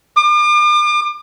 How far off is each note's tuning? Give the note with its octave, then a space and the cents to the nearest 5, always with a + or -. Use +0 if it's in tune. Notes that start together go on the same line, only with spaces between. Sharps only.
D6 +40